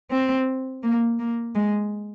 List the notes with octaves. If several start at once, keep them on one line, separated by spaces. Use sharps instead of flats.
C4
A#3
A#3
G#3